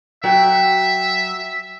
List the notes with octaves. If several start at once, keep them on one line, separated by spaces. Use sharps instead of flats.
F#3 E5 F#5 G5